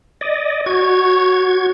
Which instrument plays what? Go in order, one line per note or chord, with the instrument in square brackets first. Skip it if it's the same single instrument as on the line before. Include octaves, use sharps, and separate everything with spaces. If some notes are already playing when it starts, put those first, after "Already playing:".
[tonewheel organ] D5 D#5
[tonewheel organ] F#4 G#6 [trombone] C#5